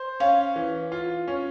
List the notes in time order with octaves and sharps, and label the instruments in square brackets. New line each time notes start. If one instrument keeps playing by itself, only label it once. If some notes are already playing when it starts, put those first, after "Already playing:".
Already playing: [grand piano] C5
[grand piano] C#4 [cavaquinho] F5
[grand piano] E3
F4
C#4